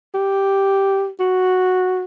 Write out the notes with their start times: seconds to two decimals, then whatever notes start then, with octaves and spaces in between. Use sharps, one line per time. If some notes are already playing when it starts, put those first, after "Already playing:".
0.14 G4
1.20 F#4